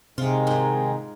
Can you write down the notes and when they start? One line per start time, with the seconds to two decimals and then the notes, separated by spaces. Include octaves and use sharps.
0.18 C3 D#3 G#3 F4
0.47 G#2